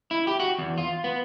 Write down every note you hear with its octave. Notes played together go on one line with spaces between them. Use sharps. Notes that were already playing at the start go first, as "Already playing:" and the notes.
E4
G4
F#4
E2
F4
B3